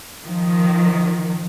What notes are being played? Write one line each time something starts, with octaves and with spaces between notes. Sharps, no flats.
D#3 F3